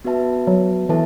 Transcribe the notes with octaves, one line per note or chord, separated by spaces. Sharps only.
B3 F#4 B4 E5 A5
F#3
E3 B3 E4 A4 E5 A5